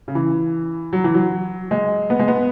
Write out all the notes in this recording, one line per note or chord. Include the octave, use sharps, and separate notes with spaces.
C#3
E3
F#3
E3
F#3
G#3
B3
G#3
B3